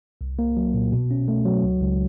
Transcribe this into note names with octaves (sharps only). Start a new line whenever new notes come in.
C2
A#3
F#3
A#2
B2
C#4
A3
F#3
C#2
C#2